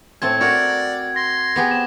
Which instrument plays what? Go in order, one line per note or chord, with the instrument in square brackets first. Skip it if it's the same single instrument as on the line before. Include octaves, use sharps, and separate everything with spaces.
[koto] A2 C4 A5 [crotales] G#6
[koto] F#4 A#4 [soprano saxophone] D5 [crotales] G#6
[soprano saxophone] C6 [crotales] A#6
[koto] B3 G4 G#4
[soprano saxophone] C4 [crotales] E7